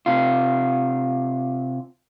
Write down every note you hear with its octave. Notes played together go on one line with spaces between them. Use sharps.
C3 F4